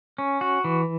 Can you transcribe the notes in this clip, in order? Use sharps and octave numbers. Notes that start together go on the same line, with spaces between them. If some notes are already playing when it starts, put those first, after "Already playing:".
C#4
F#4
E3